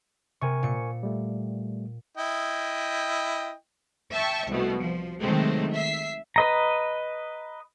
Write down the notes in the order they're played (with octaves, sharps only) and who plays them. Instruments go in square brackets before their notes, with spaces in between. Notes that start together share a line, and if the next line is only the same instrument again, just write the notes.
[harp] C3 [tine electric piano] A#4 G#5 C#6
[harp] A#2 C#7
[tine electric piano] G3 A3
[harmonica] E4 D#5 G5
[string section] E5 G5 A5 C#6
C2 B2 A3
F3
C3 D#3 F#3 G#3 A3 C4
E5 B6 C7
[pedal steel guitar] B4 D#5 A#5